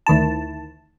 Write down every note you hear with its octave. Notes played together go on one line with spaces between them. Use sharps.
D2 D#3 E4 A5